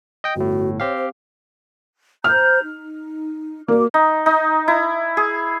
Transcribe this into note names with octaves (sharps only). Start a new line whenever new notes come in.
D#5 G5
G1 A2 F#4
C4 G4 C#5 F5
C5
C5 A#5 F6 G6
D#4
A#3 F#4 D5 D6
D#4
D#4
E4
G#4